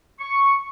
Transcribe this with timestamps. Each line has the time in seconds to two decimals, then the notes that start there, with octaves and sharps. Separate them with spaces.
0.20 C#6